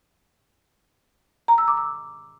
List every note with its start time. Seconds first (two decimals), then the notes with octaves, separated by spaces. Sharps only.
1.48 A#5
1.58 E6
1.68 D6
1.77 E6